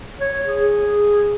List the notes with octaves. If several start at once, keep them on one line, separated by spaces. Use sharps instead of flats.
C#5
G#4